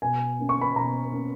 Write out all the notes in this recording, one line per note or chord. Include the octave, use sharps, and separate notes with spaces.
B2 G#5
A#3 C#4
C#6
B5
B2 A#5
A#3 C#4